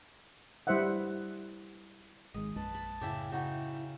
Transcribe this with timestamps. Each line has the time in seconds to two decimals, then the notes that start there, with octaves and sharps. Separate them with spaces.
0.67 G3 E4 C5 D#5 E5 F#5
2.34 G#1 D#3 G#3 D#5
2.56 A#1 F#2 G#3 B4 A5
2.74 B5
3.01 F#2 A2 C#3 E4 E5 G5 D6
3.31 C#3 D#4 E4 F#4 G5